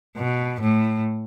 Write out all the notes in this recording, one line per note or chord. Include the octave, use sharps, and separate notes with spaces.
B2
A2